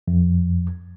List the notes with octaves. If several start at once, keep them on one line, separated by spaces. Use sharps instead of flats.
F2